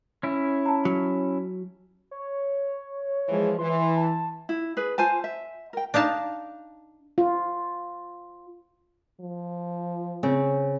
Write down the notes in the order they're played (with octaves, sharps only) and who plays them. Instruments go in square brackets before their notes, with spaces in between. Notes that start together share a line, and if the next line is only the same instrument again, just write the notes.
[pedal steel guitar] C#4 E4
[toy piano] A5 A#5
[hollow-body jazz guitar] F#3
[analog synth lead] C#5
[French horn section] E3 F3 G#3
[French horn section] E3 [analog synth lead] C6
[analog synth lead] A5
[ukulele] E4
G#4 B4
F4 C5 G#5 A5
E5
A#4 G5
[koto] D4 D#4 F5 A5
[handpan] F4
[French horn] F3
[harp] C#3 [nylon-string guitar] C4